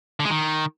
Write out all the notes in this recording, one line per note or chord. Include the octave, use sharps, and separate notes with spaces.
D3
G#3
D#3